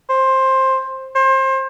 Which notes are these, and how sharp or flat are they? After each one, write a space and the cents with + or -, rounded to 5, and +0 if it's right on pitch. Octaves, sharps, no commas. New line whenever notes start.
C5 +15
C5 +30